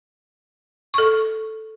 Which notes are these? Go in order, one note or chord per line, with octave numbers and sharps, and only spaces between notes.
A4 C#6